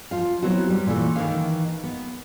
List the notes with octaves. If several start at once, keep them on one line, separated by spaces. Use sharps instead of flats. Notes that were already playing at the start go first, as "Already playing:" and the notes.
F3 F4 F5
F#3 B3 C4 E4 F#4
G3
A#2 E3 A3
D#3 E3 D#5 F5
B3